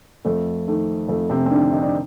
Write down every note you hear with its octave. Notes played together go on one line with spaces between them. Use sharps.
F2 A3
D#3 A3
F2 A3
C3 C4
C4
D3 D#3 D4
D#4
D4